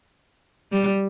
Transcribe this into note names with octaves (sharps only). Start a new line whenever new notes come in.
G3